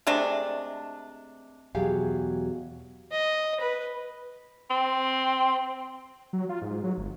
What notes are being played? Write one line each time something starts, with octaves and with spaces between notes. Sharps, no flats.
C3 G#3 A3 D4
E2 B2 F#3 G4 G#4 F5
D#5
B4
C4
F#3
F4
G#2
F#3
G1